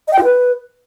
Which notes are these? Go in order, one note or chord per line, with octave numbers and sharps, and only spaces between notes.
D#5
G5
F4
B4